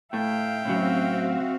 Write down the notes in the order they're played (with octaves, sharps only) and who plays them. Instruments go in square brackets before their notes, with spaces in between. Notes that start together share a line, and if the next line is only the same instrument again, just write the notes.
[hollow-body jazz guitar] A2 A3 [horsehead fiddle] E5 F5 [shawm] G5
[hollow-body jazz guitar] A2 C#3 F#3 [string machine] C4 F#4